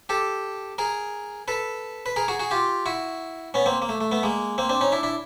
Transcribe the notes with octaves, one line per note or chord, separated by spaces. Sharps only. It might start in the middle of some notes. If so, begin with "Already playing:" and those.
G4 A4
G#4 A#4
A4 B4
B4
G#4 A#4
F#4 G#4
F#4 G#4
F4 G4
E4 F#4
B3 C#4
A#3 C4
A#3
A3
A3
A3 B3
G#3 A#3
A#3 C4
C4 D4
C#4 D#4
D4 E4
D4 E4